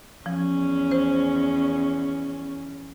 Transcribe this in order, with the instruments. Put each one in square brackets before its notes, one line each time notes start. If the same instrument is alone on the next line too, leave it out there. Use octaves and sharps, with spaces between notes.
[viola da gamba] E2 C#4 [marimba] F3
[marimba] C5